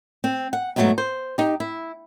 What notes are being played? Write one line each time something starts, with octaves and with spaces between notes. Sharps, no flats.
C4
F#5
G#2 B2 F#3 G#3 A3
C5
D#4 G4
E4